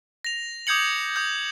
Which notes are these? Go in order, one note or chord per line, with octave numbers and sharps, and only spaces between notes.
A#6 F7
D6 D#6 G6 G#6 C#7 F#7
D#6 G6